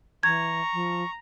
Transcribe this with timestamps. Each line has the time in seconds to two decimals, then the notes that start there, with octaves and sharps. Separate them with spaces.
0.23 E3 A#5 C#6 G#6
0.73 F3